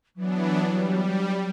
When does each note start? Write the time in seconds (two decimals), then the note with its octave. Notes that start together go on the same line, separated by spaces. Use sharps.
0.16 E3 F#3 B3 D4
0.67 G3